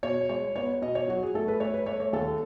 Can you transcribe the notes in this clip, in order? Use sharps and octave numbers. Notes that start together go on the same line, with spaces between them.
B2 C#5
G#3 C#5
B3 C#5
B2 D#5
C#5
F#3 F#4
G#4
A3 A4
B4
A3 C#5
B4
A3 C#5
C#5
D#2 A4